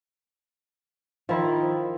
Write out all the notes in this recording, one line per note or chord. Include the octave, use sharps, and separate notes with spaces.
D#3 F3 E4